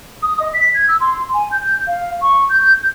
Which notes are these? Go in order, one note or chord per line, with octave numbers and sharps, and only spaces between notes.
D#6
D#5
B6
G#6
E6
C6
G#5
G6
F5
C#6
G6